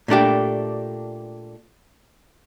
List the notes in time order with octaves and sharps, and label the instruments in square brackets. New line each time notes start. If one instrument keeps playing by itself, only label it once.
[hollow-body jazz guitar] A#2 A3 D4 G4